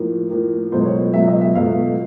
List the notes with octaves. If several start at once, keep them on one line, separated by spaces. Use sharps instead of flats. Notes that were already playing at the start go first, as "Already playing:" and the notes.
Already playing: A2 F3 A#3
A2 F3 A#3
C#2 B2 F#3 A3 C5
C#5
C#2 B2 F#3 A3 E5
D#5
E5
C#2 B2 F#3 A3 F5